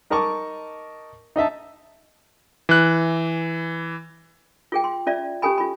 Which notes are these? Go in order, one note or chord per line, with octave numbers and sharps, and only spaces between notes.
D#4 A#4 D#5 A5 C#6 D6
D#4 D#5 E5 A5
E3 F#6
F4 G#4 G5
C6
C#4 F4 D5 E5
C#4 G4 A4 G#5 B5
F4 B5